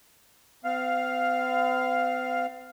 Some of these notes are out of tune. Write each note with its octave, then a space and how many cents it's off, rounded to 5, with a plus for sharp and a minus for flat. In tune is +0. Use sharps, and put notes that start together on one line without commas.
C4 -45 F5 +0